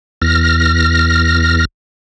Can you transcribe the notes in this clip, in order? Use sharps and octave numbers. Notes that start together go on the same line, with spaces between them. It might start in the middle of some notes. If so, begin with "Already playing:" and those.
E2 F6 A#6